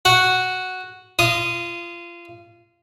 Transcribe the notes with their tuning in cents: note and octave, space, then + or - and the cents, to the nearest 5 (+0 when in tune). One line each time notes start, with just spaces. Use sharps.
F#4 +0 F#5 +0
F4 -25 D#5 +0 D#6 -5